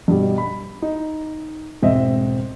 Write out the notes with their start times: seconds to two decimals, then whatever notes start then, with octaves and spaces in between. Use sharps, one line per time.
0.08 G2 B2 G3
0.38 B5
0.82 D#4
1.82 E1 G#2 C4 D#5 E5